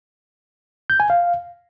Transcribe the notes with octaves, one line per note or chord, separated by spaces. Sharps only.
G6
G#5
F5